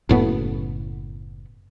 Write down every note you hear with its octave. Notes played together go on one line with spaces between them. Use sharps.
F#1 A2 B3